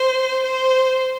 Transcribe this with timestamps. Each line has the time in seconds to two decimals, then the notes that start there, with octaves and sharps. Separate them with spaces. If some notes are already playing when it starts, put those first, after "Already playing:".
Already playing: C5
0.44 C5